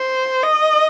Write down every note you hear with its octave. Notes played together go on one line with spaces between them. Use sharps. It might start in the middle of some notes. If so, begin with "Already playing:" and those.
Already playing: C5
D#5